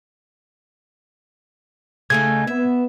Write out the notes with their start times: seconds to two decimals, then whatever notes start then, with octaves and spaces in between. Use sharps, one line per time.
2.10 C#3 A3 D#4 G#6
2.47 B3 E5